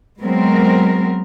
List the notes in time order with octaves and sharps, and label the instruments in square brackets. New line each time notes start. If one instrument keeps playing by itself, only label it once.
[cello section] F#3 G#3 B3 C4 A#4